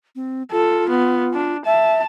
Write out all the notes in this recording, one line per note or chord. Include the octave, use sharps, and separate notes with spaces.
C4
F4 A4
B3
D4
E5 A5